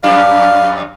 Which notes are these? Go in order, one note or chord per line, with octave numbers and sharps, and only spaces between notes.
F2 G3 D4 F5